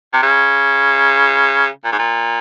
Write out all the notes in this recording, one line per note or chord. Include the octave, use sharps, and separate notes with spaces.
C3
C#3
A#2
G#2
A#2